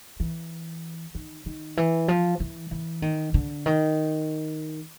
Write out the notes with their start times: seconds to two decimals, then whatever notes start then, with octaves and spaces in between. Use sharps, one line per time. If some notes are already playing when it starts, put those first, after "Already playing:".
0.20 E3
1.15 D#3
1.46 D#3
1.77 E3
2.08 F3
2.40 E3
2.71 E3
3.02 D#3
3.34 D3
3.66 D#3